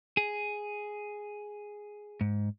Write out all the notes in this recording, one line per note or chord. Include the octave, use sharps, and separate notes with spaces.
G#4
G#2